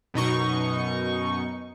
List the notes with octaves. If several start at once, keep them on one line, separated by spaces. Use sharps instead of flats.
F#2 B2 D#4 C#6